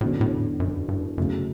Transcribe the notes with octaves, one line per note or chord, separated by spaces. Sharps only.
E2 A2 D3 F#3 C#4 F#4
A2
F#2
G2
F#2 C#3 F#3 A3 C#4